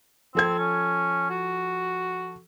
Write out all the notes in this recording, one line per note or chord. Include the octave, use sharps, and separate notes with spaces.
F3 C4 A4 G#6
C#4
F#4